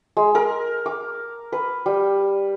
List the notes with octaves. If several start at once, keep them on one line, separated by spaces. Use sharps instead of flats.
G#3
A#4
D6
B4
G3